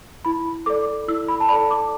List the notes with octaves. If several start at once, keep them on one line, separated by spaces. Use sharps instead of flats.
E4 B5
A4 D5 D6
E4 E6
B5
A5
A4 D5 B5
D6